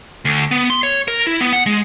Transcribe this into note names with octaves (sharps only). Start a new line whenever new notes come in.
D2
B3
C6
C#5
A#4
E4
B3
F#5
G#3